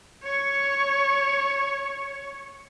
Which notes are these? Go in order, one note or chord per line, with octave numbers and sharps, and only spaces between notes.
C#5 C#6